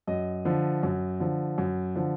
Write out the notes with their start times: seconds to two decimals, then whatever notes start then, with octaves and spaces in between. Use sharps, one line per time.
0.07 F#2 D#5
0.45 D3 F3
0.83 F#2
1.20 D3 F3
1.58 F#2
1.95 D3 F3